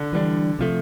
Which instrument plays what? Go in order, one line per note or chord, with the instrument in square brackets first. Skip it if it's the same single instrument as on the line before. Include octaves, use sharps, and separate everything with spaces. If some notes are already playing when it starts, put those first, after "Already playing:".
Already playing: [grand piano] D3
[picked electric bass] E3 G3 A#3 D4
C3 F3 A3